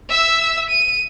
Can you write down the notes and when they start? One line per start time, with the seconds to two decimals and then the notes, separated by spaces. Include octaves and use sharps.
0.10 E5 E6
0.70 D#7